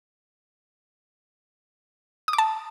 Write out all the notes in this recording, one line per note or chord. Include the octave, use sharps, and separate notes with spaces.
D#6
D6
A5